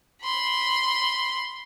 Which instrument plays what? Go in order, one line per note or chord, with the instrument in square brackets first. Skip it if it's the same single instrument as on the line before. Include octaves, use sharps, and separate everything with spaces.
[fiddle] B5 C6